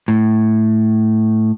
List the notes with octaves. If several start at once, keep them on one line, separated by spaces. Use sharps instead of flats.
A2